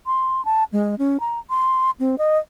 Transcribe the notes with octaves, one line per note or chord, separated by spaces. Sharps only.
C6
A5
G#3
C#4
A#5
C6
C4
D#5